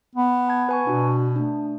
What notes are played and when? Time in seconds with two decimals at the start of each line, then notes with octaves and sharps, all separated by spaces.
0.15 B3
0.48 A5 G#6
0.69 B4 G#5 C#6
0.87 B2 D4 F#4
1.36 A3 D4